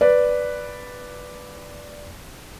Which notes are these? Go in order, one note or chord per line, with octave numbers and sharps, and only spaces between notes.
B4 D5